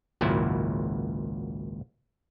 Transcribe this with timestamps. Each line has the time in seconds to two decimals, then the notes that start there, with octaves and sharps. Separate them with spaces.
0.21 G#1 C#2 A#2 F#3 E4